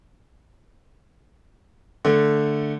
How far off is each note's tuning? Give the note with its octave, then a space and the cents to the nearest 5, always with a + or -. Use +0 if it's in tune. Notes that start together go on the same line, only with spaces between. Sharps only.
D3 +0 A3 +0